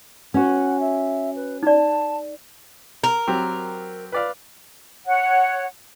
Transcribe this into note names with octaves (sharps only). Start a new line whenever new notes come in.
C#4 F#4 F#5
E5
B4
D#4 D5 A5
A#4
F#3 C4 G4
B4 D5 F5
C#5 F#5